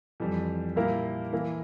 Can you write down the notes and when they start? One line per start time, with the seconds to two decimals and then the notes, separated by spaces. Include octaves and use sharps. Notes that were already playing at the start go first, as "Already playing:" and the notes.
0.20 F2 E3 G3
0.76 A#2 G3 A#3 E4 A#4
1.33 E3 A#3 E4